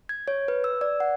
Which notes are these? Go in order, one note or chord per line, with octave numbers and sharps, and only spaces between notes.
G#6
C#5
B4
E6
D5
F#5